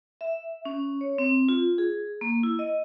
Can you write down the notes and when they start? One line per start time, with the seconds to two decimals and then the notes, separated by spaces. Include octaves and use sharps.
0.21 E5
0.65 C#4
1.01 C#5
1.18 C4
1.49 F4
1.78 G#4
2.21 A#3
2.43 E4
2.59 D#5